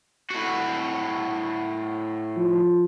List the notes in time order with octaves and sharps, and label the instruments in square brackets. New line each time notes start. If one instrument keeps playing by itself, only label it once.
[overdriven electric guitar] A2 F#4
[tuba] F3